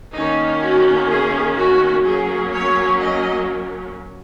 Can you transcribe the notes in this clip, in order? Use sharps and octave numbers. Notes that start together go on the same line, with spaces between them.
D#3 A#3 C#4 D#4
F#4
G#4
F#4
F#3 A#3 C#4 G#4
C#5
D#5